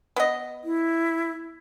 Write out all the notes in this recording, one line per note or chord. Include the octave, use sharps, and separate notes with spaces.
B3 D#5
E4